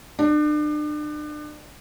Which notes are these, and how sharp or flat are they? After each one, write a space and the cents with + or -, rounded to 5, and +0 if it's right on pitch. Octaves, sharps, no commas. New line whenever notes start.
D4 +35